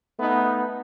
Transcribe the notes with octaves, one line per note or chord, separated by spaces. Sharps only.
A3 B3 D#4